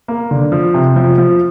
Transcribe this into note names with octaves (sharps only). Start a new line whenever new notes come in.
A#3
D3
F3
C3
F3
F3